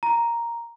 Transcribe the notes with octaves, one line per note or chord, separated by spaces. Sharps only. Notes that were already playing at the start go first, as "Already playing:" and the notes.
A#5